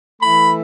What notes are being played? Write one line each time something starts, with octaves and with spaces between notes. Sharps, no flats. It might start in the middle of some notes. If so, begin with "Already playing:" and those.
E3 A3 E4 B5